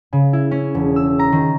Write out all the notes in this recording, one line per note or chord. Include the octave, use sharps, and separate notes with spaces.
C#3
E4
C#4
E1
E6
A#5
D#3